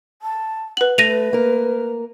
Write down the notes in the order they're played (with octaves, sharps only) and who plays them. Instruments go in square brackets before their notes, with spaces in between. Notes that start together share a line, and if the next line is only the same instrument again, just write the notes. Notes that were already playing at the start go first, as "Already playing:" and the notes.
[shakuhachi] A5
[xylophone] B4 F#7 [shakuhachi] F#5
[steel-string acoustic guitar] A3 [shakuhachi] B4 [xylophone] A#6 D#7 F7
[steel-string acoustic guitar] A#3 A#4